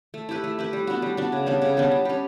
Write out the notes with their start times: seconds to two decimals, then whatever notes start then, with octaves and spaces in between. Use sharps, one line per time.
0.14 A3
0.29 E4 G4 B4
0.44 A3
0.59 E4 G4 B4
0.73 G3
0.87 B3 D4 F#4
1.02 G3
1.17 B3 D4 F#4
1.32 C#3
1.46 G3 B3 D4
1.62 C#3
1.77 G3 B3 D4
1.91 G3
2.05 C#4 G4